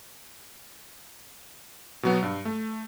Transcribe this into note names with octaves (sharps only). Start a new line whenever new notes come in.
B2 F#3 B3
G2
A3